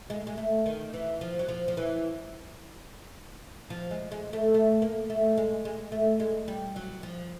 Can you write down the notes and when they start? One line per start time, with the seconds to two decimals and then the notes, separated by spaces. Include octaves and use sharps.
0.10 G#3
0.27 G#3
0.38 A3
0.66 D#3
0.93 E3
1.21 F3
1.39 F#3
1.49 F3
1.68 F3
1.77 E3
3.70 F3
3.91 G#3
4.12 G#3
4.33 A3
4.54 A3
4.82 A#3
5.10 A3
5.37 G#3
5.65 G#3
5.92 A3
6.20 G#3
6.48 G3
6.76 F#3
7.03 F3